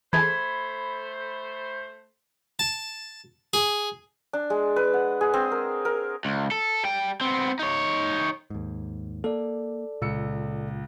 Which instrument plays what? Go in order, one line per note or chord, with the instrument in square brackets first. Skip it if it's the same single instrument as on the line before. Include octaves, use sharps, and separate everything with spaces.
[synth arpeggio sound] E3 G#4 A4 [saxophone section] A3 C5 [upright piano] B5 [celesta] G#6
[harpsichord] A5
G#4
[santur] D4
G#3
B4
F#5
G#4
C4
A#4
A#4
[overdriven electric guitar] C#2
A4
G3 G5
B3 C4
D#4 C#5
[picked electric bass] D#2 G#2
[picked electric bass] A#3 [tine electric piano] A4 D5
[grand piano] C#2 E6 C#7 [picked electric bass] A#2